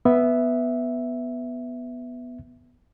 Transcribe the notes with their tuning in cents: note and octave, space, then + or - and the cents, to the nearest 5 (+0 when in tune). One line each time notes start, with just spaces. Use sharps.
B3 +0 E5 +0